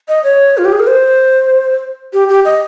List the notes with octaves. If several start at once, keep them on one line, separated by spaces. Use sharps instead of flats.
D#5
C#5
F4
G4
G#4
A#4
C5
G4
G4
D#5